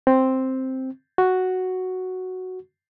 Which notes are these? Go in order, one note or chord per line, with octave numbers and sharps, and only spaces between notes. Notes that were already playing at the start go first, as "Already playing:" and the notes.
C4
F#4